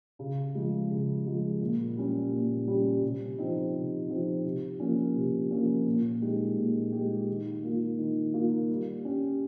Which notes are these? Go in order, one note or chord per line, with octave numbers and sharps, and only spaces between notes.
C#3
F3 G#3
C#3
F3 G#3
A#2
G3 C#4 G4
A#2
G3 C#4 G4
C3
F3 C4 D#4
C3
F3 C4 D#4
C3
F3 A#3 C#4
C3
F3 A#3 C#4
A#2
G#3 D#4 G4
A#2
G#3 D#4 G4
D#3
A#3 F4
D#3
A#3 F4
G3
C#4 G4